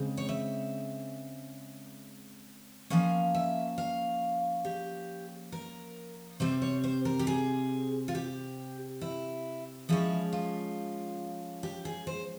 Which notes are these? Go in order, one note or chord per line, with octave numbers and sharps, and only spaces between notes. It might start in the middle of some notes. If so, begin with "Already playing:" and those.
Already playing: C#3 G#3 C4
C#5
E5
F3 A#3 C#4 F5
E5
F5
G4
A#4
C3 G3 C4 C5
C#5
C5
A#4
G4
G#4
F4
G4
E4
F3 G#3 C#4 E4
F4
G4
G#4
C5